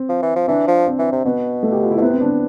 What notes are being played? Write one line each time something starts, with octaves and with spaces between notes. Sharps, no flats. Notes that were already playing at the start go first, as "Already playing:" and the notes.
Already playing: C4
F3
E3
F3
E3 D4
F3
C4
E3
C3
B2 B3
A3
G4
F4
E4
B2
C3 B3
C4
D4
C4